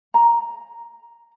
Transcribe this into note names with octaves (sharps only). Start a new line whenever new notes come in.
A#5